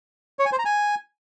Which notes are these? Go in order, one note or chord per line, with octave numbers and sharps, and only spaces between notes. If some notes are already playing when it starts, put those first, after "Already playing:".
C#5
G#5
C5
A#5
G#5